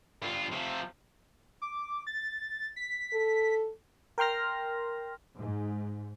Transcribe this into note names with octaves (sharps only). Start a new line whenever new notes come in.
G2 F4
C3 F3
D6
A6
B6
A4
A#4 G5 C6 F6 A#6
G#2